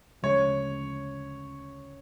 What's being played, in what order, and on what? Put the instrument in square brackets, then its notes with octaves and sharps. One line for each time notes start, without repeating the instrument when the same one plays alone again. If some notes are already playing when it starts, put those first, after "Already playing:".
[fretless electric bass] D2 C#3 F3 G#3 [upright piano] C#5